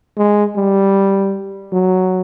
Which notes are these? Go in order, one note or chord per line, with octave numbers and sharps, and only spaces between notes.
G#3
G3
F#3